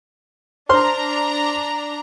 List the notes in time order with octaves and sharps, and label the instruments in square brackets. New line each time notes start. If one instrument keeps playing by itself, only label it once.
[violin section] D4 A#5 [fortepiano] C5 C6 F6